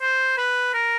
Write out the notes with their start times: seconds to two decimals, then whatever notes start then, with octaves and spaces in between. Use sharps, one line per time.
0.02 C5
0.38 B4
0.74 A#4